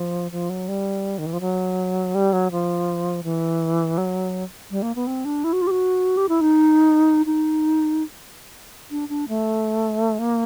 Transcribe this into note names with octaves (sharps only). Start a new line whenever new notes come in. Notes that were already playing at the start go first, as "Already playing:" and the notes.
Already playing: F3
F3
F#3
G3
D#3
E3
F3
F#3
G3
F#3
F3
E3
F#3
G3
A#3
B3
C4
D4
E4
F#4
F4
G4
F#4
G4
E4
D#4
D#4
D4
D4
A3
A#3